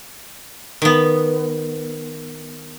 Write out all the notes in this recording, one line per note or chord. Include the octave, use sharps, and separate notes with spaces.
D#3 B3